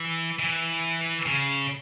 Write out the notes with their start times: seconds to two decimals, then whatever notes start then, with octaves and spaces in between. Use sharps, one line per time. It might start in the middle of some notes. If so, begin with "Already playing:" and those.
Already playing: E3
0.39 E3
1.26 C#3